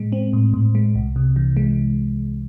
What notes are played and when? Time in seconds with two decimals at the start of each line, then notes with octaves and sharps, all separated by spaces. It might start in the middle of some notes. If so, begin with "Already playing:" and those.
Already playing: A2 G#3
0.12 C4
0.33 A2
0.54 A2
0.75 G#3
0.95 C2
1.16 C3
1.36 E3
1.57 G#3